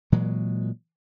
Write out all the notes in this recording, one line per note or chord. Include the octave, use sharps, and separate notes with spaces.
A#2 E3 F#3 G#3